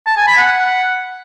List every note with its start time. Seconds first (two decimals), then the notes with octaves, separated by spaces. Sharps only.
0.06 A5
0.17 G#5
0.27 B5
0.38 F#5